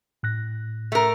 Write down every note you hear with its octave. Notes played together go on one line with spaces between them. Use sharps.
A2 F#6 A#6
A3 A#4